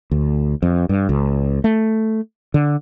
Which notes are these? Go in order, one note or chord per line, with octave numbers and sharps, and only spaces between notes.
D2
F2
G2
C#2
A3
D3